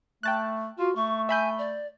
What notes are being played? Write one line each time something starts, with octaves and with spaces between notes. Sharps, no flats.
A3 G5 A5 F#6
F4 F#4
A3 C#6
E5 G#5 B5 G6
D5